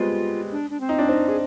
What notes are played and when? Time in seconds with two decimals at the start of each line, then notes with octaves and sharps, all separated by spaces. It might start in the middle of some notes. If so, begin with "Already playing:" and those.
Already playing: G3 G#3 B3 C4 F4
0.52 D4
0.70 D4
0.81 C4
0.89 D#4
0.99 D4
1.09 C4 D#4
1.28 G#4